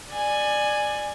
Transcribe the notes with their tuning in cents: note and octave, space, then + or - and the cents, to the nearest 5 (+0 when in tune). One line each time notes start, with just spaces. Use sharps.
D5 +20 G#5 +0